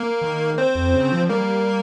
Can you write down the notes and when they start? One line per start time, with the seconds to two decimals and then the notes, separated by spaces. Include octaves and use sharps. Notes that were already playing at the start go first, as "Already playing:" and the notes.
Already playing: A#3 A#4
0.22 D#3
0.58 C4 C5
0.75 F2
0.94 C#3
1.12 F3
1.29 G3 A#3 A#4